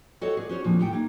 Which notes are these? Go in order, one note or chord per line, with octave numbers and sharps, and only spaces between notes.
F#4 A4 C5 C#5 D#5 F#5
G#4 B4 D5
C#4 F#4 C5 C#5
E2 A#2 D3 F3 A3 C4
E2 A2 A3 G4 F#5 G5
A3 A#3 D#4